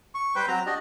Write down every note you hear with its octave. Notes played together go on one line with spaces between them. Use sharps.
C#6
G3 B4 C5 G5
F#3 C4 A#5
D4 F#4 G4 D#5